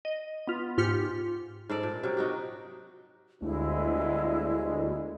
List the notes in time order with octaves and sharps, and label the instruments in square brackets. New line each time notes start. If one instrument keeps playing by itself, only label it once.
[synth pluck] D#5
B3 F4
G#2 F4 G4 F6 B6 C#7
[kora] G#2 A4 D5
A#2
C3 F#3 A#4
D#4 F#4 G4
[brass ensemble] G1 D3 G#3 [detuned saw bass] D2 [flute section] E4